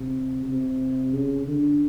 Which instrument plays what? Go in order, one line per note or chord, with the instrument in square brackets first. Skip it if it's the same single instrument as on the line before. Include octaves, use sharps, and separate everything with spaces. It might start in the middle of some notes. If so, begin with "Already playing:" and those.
Already playing: [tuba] C3
C3
C#3
D3